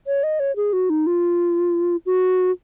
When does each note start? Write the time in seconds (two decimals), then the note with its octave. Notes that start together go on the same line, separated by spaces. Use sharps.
0.07 C#5
0.23 D#5
0.40 C#5
0.56 G#4
0.73 F#4
0.90 D#4
1.07 F4
2.06 F#4